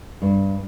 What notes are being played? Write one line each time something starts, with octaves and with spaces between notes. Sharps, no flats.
G2